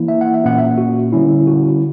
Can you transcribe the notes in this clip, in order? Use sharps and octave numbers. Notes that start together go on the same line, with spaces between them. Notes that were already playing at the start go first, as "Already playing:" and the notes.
Already playing: E3 A#3 E4
E5
F#5
E5
A#2 A#3 C#4 F#5
E5
F#4
D3 G3 C#4 E4
F#4